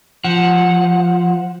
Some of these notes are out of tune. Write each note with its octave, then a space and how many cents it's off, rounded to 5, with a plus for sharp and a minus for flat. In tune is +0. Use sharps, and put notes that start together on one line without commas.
F3 +0 F#5 -10